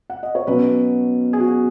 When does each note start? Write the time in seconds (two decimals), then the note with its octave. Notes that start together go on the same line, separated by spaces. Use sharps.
0.10 F#5
0.23 D#5
0.35 C#5
0.47 B2 F#3 C#4 B4
1.33 G#4
1.39 F#4